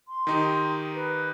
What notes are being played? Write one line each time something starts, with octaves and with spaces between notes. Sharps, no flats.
C6
D#3 D#4 G4
B4